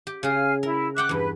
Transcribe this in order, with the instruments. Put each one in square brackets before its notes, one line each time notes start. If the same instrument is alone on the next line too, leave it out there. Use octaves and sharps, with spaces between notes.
[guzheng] G4
[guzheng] C#3 G#4 [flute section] F5 G#5 F6
[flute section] E4 [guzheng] A#4
[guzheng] E5 F#5 G5 [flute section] D6 F#6
[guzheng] E2 G2 [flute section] B4